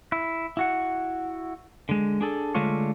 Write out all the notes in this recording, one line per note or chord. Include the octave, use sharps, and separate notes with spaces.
E4
E4 F#4 F#5
D3 G#3
D4 G#4 A4
D3 G#3 A3 D4 F4 C#5